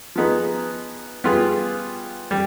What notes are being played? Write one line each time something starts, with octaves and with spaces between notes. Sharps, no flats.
F3 B3 D#4 G#4
G3 B3 F4 G#4
G3